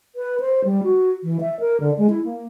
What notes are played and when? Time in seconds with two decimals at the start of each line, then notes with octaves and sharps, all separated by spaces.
0.16 B4
0.40 C5
0.64 G3
0.84 F#4
1.23 E3
1.41 E5
1.60 A#4
1.80 D3
1.98 G#3
2.10 E4
2.25 A#3